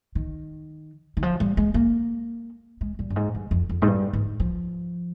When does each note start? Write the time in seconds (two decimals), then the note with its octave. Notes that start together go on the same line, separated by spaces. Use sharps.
0.15 D#3
1.17 D#3
1.23 F3
1.40 G3
1.57 G#3
1.74 A#3
2.81 G#3
2.99 G3
3.10 G2
3.16 G#2
3.34 G2
3.51 F2
3.69 F2
3.82 G#2
3.87 G2
4.13 G#2
4.40 F3